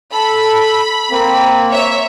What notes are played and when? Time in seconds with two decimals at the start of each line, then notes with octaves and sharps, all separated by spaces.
0.13 A4 B5
1.11 A#3 C4
1.70 C#5 E5